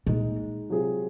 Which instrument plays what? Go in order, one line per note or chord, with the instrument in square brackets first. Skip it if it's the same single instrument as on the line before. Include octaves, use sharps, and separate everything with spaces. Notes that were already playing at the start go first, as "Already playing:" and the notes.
[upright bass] A#2 [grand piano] G#3 D#4 G#4
[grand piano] C3 F#3 C4 F4 G#4